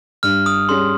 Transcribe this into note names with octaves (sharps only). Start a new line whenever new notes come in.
G2 F6
D#6
G3 C#4 G#4 C6